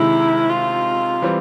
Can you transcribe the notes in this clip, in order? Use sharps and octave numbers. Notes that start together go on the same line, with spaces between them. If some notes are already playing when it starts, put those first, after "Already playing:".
Already playing: C3 D#3 G#3 E4
F4
E3 G3 C4